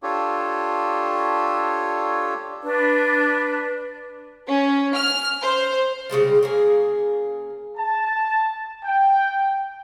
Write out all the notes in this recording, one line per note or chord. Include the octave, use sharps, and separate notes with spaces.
D4 F4 G4 A4 C#5
D4 B4
C#4
F6
C5
C#3 G3 G#3 A5
C#3 A#3 G#4
A5
G5